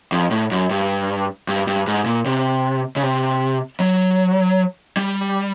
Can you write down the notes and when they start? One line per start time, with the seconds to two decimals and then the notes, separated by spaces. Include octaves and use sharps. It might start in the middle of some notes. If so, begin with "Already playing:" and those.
0.12 F2
0.31 A2
0.51 F#2
0.70 G2
1.48 G2
1.67 G2
1.87 G#2
2.06 A#2
2.26 C3
2.96 C#3
3.03 C3
3.80 F#3
4.97 G3